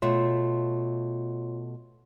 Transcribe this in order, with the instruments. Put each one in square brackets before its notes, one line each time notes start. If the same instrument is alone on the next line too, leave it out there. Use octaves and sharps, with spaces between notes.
[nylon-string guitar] B2 A3 E5 [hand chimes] F4 C#5 C6